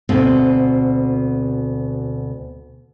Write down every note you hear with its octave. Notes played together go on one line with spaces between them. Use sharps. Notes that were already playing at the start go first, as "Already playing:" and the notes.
D2 B2 C4